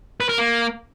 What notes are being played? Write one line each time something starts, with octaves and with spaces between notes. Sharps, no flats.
B4
A#4
A#3